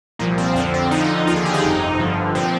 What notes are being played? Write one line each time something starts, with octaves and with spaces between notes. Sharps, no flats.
C2 A#2 F3 A#3
C4
F2 D3 F3 C4
C4
F2 D3 F3 D#4
D#2 D3 F3 F4
G#4
G4
D#4
G1 F2 C3
G1 G2 D3 F3
A#2 F3 C4